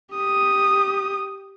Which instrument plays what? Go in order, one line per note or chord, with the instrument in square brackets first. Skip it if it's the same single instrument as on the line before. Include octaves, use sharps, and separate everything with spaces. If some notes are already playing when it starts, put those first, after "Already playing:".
[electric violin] G4 D#6